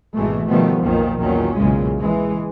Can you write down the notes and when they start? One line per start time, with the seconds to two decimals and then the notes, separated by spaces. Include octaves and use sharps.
0.16 G#1 B2 E3 G#3 A3
0.49 B2 D#3 F3 G3 A3 B3
0.81 B1 F2 A#2 D#3 F3
1.18 E2 A#2 D#3 F#3 C#4
1.56 B1 E2 A#2 C#3 G#3
2.00 E3 G#3